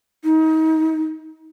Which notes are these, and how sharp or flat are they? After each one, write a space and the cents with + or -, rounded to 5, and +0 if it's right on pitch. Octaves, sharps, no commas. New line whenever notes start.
D#4 +30